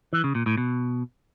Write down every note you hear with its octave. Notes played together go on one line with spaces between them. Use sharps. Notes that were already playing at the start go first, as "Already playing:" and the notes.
E3
C#3
A#2
A2
B2